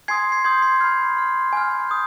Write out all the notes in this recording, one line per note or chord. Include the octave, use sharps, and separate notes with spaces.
G#5 C6 D#6 G#6 C7
G#6 C7
C6 D#6 G6 G#6
G#6 C7
B5 F6 G#6 C7
C6 F6
G#5 B5 F6
D#6 G6